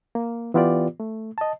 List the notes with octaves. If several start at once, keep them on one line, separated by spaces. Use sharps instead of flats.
A#3
E3 B3 F4 G4 D5
A3
D#5 A5